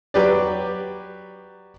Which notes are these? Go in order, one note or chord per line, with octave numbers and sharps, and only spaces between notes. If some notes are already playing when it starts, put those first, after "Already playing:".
F#3 G4 B4 D5